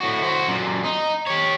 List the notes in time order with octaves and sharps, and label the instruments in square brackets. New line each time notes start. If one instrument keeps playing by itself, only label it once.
[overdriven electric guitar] A2 F#4
F#4 C5
F#2 A#2
D#4
G4 C#5